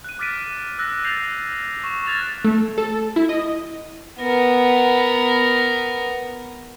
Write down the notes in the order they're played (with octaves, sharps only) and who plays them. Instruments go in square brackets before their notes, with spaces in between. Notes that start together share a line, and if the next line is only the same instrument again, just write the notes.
[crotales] F#6 D#7
D6 F6 A6 B6 D7 D#7
E6 F#6 A#6
G6 A6 A#6 C7 F7
C#6 E7
F6 F#6 G#6 A6 F7
[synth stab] A3
A4
E4
D#5
[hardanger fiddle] B3 A#4